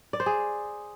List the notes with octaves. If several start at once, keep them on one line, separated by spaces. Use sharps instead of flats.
D5
C5
G#4